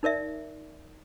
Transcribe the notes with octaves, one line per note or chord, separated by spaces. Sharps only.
D#4 A#4 D5 E5